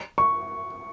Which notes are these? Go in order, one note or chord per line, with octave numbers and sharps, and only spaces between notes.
C#6